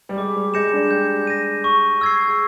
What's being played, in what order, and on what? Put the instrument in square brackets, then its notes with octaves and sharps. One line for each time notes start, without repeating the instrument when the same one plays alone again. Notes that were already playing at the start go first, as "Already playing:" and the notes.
[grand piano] G3
[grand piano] G#3 [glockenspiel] D6
[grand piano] G3
[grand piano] G#3 [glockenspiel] G6 A#6 C#7 E7
[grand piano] D4
[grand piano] G4 [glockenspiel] G6
[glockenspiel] A#6 D#7
C#6
E6 G#6 C7
[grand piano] G#4